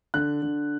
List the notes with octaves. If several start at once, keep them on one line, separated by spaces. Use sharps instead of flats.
D3 F#6
D3